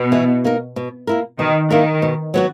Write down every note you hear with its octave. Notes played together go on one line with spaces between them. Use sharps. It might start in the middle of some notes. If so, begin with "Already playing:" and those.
Already playing: B2
E3
A#3 D#4 A#4
B2
A#3 E4 A#4
B2 D#3
D#3 A#3 E4 A#4
B2
F#3 B3 F#4